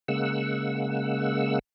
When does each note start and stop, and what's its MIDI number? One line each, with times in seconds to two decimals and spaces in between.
0.08 1.59 49
0.08 1.59 56
0.08 1.59 58
0.08 1.59 78
0.08 1.59 88